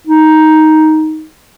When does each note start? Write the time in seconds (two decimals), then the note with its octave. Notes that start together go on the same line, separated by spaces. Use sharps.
0.07 D#4